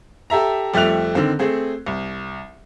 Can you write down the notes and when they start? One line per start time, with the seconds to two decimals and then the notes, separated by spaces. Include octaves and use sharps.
0.30 G4 A4 E5 A#5
0.74 F2 G3 A3 E5 F#6 F7
1.15 D3 D#3 C4
1.39 A3 C4 G#4
1.86 C2